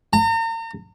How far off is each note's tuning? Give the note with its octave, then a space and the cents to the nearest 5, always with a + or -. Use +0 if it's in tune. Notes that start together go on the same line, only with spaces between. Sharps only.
A#5 -40